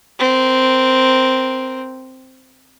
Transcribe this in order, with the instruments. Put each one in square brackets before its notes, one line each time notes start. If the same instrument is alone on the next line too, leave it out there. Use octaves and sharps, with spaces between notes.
[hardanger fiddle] C4 A#4